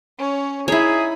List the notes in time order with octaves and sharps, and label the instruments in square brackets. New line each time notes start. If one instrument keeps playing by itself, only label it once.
[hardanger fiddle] C#4 C#5
[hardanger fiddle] D#4 B5 [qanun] E4 C#5 [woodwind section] G#4